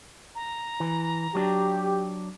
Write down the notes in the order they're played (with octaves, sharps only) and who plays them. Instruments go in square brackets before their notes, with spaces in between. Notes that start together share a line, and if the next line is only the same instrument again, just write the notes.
[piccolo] A#5
[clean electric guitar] E3
[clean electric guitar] F#3 D4 [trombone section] G4